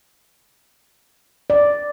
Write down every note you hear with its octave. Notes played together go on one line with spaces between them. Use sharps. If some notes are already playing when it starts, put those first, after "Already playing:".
D5